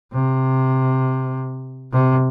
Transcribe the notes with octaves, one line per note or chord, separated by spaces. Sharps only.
C3
C3